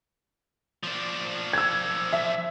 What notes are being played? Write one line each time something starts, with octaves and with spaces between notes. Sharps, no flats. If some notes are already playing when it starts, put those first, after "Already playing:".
F3 D4
E6 G#6
E5